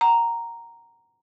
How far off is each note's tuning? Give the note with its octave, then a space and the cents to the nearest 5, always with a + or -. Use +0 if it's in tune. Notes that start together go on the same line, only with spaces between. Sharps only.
F#5 +30 A#5 +0